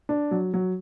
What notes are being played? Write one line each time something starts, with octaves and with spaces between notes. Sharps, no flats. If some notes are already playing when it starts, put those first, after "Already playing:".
D4
F#3
F#3